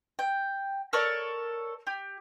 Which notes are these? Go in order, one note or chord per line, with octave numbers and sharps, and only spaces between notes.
G5
A4 A#4 C#5 D5
G4